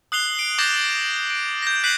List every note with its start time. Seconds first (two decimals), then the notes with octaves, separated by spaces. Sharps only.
0.12 D#6 F#6 C7 F7 G7
0.39 D7
0.58 D6 D#6 G6 A6 A#6 E7
1.30 D7
1.62 G6 A#6
1.84 F#6 B6 C7 D#7 F#7